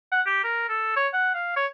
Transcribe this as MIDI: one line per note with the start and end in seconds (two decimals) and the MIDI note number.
0.12 0.21 78
0.26 0.42 67
0.44 0.66 70
0.69 0.94 69
0.96 1.08 73
1.14 1.34 78
1.34 1.52 77
1.56 1.67 73